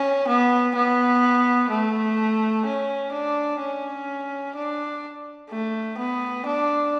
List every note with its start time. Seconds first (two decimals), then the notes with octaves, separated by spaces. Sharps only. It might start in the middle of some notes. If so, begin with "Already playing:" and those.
Already playing: C#4
0.28 B3
0.76 B3
1.71 A3
2.66 C#4
3.13 D4
3.61 C#4
4.56 D4
5.50 A3
5.99 B3
6.46 D4